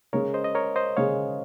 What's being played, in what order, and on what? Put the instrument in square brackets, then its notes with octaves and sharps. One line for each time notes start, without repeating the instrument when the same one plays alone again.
[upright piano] C#3 G#3 C#4 G#4 [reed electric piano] A#4 C#5
[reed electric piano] C5 D#5
D#5
A#4 C#5
C5 D#5
[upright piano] C#3 G#3 C#4 G#4 [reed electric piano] C#5 F5